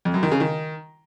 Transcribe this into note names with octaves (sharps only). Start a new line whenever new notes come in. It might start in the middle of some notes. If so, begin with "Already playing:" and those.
F2
F#2
D#3
C#3
D#3